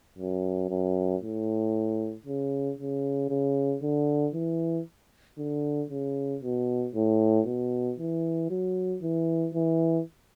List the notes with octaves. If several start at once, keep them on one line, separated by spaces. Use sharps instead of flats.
F#2
F#2
A2
C#3
C#3
C#3
D3
E3
D3
C#3
B2
A2
B2
E3
F#3
E3
E3